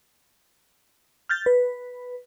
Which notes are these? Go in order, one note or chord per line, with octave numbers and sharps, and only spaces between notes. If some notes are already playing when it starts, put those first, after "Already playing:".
F6 G6 A6
B4